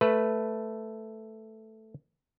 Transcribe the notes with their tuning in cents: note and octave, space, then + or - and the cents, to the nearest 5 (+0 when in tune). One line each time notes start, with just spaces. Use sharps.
A3 +0 B4 +0